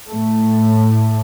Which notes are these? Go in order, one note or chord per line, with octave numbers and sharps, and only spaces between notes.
A2 A3